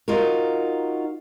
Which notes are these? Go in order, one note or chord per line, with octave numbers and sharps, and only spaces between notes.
D#4 F4 F#4 A#4